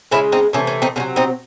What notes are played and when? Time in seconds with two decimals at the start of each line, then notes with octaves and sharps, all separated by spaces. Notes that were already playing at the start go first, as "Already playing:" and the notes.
0.11 C#3 G#3 C#4 E4
0.32 C4 D#4
0.53 C3 E3 A3 C#4
0.67 C#4
0.82 C4 D#4
0.96 C3 D#3 F#3 C#4
1.16 C4 D#4